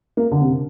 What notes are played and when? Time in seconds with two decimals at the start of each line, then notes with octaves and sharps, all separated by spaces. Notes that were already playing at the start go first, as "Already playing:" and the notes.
0.17 A#3
0.32 D3
0.40 C3